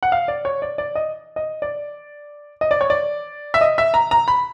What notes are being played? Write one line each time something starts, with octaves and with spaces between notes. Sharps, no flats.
F#5
F5
D5
C#5
D5
D5
D#5
D#5
D5
D#5
D5
C#5
D5
E5
D#5
E5
A#5
A#5
B5